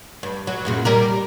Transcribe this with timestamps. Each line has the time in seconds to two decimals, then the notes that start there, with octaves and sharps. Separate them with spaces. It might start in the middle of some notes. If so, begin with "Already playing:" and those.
0.23 G2
0.47 F#3
0.65 F#2 A#2 C#3
0.85 G3 G4 A#4